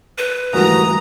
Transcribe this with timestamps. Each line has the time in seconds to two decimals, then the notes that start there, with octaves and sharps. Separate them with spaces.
0.18 B4
0.53 G#1 D2 E3 G3 F#4 A#4 A#5 D#6